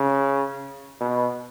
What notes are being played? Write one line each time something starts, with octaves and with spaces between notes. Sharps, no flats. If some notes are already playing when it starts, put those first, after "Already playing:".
Already playing: C#3
B2